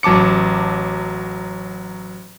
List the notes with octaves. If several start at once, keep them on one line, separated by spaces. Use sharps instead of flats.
A1 F#3 A5 D6 C#7